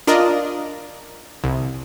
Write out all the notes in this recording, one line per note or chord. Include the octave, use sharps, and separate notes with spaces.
D4 F4 A#4 D5 D#5
C2